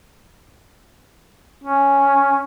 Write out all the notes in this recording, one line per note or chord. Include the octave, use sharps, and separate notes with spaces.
C#4